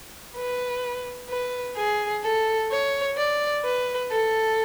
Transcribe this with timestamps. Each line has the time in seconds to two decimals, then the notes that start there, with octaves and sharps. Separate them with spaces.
0.36 B4
1.29 B4
1.77 G#4
2.24 A4
2.71 C#5
3.17 D5
3.65 B4
4.12 A4